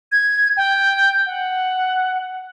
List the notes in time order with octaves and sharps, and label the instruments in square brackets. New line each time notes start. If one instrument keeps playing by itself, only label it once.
[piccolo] G#6
G5
F#5